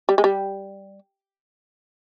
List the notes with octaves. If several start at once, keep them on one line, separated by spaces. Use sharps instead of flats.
G3
G#3
G3